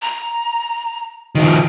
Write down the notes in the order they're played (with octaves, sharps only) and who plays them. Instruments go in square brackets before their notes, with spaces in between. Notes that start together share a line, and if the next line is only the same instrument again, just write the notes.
[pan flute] A#5
[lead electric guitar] D#3 F3